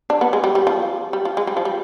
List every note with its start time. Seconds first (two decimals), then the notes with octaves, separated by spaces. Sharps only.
0.10 D4
0.21 B3
0.33 G#3
0.44 G3
0.55 G3
0.67 F3
1.13 G3
1.25 F3
1.37 G#3
1.47 G3
1.57 F3
1.65 G3